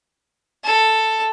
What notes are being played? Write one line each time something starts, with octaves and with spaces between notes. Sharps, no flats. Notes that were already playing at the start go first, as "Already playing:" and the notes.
A4